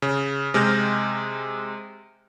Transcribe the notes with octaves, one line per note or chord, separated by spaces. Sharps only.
C#3
C3 G#3 F6 G6 A#6